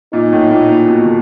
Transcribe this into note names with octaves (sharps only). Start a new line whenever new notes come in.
A#2 D#4
A2
A#2
A#2
B2
D3